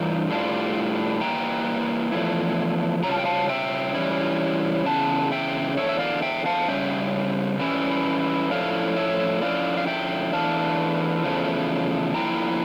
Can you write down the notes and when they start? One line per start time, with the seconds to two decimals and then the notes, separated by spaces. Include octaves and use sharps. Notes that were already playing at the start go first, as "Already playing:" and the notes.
Already playing: G2 E3 A3 D4 F4 G5 A#5
0.30 A2 G3 D4 F4
1.21 E3 G3 A#3 G5 A#5
2.12 E2 C#3 F3 A3 E4
3.03 C#3 G3 C#4 F4 A#5
3.11 A5
3.19 G5
3.25 F5 A5
3.49 E5 G5
3.94 E3 G3 C#4 E4
4.85 E2 C#3 A5
5.32 E5 G5
5.77 E2 D3 F3 C#5 E5
5.89 E5
5.99 D5 F5
6.22 E5 G5
6.46 F5 A5
6.68 C#3 G3 C#4 E5 G5
7.60 E3 G3 C#4 E4
8.50 A2 F3 A3 C#4 E4 D5 F5
8.96 C#5 E5
9.41 D3 F3 C#4 E4 D5 F5
9.77 F5
9.87 E5 G5
10.33 E2 E3 A3 D4 F5 A5
11.24 E2 C#3 F3 A3
12.15 D3 F3 A#3 E4 G5 A#5